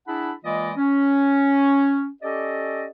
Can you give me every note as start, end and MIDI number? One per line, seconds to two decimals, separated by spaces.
0.07 0.31 62
0.07 0.31 64
0.07 0.31 68
0.07 0.31 78
0.07 0.31 81
0.07 0.31 83
0.43 0.72 52
0.43 0.72 56
0.43 0.72 58
0.43 0.72 65
0.43 0.72 74
0.43 0.72 75
0.77 2.08 61
2.22 2.86 61
2.22 2.86 67
2.22 2.86 69
2.22 2.86 74
2.22 2.86 75